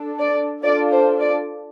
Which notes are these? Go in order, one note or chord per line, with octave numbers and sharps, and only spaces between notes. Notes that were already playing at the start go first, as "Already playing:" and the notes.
Already playing: D4 A4
D5
D4 F4 A4 D5
C5
D5